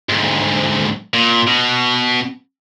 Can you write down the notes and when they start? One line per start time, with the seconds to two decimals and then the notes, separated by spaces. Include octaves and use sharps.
0.09 D2 G#2
1.14 A#2
1.48 B2